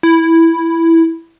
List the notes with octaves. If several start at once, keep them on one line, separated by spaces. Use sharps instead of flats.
E4